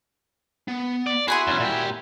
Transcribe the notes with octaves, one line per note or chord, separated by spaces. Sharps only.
B3
D5
F#4 G#4 E5 G#5 B5 C6
E2 C#4
A#2 G4